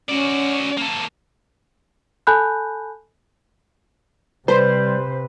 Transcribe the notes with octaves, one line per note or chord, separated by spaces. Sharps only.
C#4 F#4 D5
A#3 A4
A4 G#5 A5 B5 F#6 G6
C3 G3 B4 C5